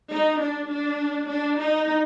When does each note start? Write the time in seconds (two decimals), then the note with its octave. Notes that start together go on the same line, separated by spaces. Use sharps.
0.10 D#4
0.41 D4
0.70 D4
1.29 D4
1.60 D#4